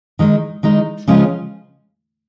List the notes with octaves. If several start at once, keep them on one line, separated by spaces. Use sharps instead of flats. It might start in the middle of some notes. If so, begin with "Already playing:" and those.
D#3 G#3 D#4
D#3 G#3 D#4
C#3 F3 G#3 C#4 F4